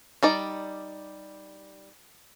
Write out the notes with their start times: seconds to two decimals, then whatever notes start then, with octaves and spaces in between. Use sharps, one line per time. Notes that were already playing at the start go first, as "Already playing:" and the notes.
0.23 G3 D#4 D5